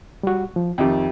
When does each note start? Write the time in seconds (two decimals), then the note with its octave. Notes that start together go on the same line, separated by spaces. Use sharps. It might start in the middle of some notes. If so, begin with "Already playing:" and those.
0.23 G3 F#4
0.56 F3
0.78 F2 D#3 G4 E5 G5